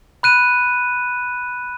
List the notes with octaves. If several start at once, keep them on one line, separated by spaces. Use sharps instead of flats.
B5 F#6 D#7